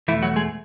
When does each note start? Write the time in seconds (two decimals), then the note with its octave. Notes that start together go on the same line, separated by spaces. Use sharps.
0.08 E2 B2 E3 A3 E4
0.22 F#3 F#4
0.36 G#3 G#4